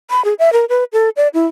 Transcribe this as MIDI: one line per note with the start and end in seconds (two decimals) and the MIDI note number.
0.10 0.24 83
0.25 0.34 68
0.39 0.52 76
0.53 0.65 70
0.69 0.84 71
0.93 1.09 69
1.17 1.28 74
1.34 1.47 64